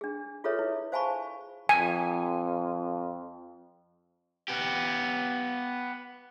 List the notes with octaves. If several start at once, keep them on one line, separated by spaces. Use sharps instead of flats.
D4 G#4
F4 G#4 A4 B4 C#5 E5
E4
C5 F5 G#5 A5 B5 C#6
F2 G#5
B3 G4